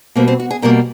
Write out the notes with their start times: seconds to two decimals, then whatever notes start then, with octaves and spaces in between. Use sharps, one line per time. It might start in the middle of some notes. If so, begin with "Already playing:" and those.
0.16 B2 G3 A#3 C4
0.28 C4
0.40 F#4
0.51 G#4
0.62 B2 G3 A#3 A#4